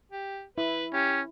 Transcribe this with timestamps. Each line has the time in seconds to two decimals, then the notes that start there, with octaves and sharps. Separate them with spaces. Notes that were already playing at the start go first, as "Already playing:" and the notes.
0.12 G4
0.58 E4 B4
0.94 C#4 G4